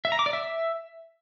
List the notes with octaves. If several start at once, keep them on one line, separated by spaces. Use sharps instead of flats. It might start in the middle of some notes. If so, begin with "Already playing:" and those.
E5
A#5
D6
D5
E5